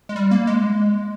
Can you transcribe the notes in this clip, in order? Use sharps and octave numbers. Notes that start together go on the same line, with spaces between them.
G#3
G3
A#3
G#3